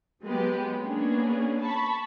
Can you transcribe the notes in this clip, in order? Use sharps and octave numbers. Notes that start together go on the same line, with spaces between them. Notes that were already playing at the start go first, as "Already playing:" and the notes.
F#3 G#3 B3 G4
A#3 B3 C#4 D4 G#4
A5 B5 C#6